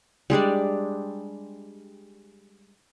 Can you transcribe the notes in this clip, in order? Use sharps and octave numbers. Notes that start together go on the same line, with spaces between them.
G3 G#3 D4 D5